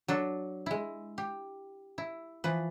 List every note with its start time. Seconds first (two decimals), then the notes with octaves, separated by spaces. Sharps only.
0.08 F#3 D4 A4
0.66 G#3 E4
1.18 G4
1.98 E4
2.44 E3 F3 B4